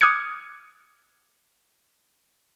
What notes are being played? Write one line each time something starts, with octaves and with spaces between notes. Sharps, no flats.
D6 D#6 F6 F#6 G#6 C#7